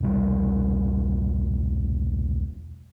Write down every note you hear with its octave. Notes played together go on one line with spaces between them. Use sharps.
E1 C2 G3